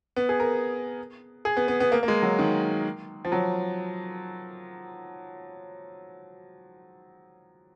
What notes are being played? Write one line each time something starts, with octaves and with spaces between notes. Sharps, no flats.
B3
G#4
A#4
G#4
B3
B3
B3
A#3
A#3
G#3
F#3
D#3
F3
F#3